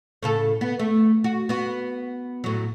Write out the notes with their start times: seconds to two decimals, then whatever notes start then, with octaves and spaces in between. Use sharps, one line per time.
0.23 A2 C#3 A4
0.61 B3
0.79 A3
1.24 F#4
1.49 B3 F#4
2.44 A2 F#3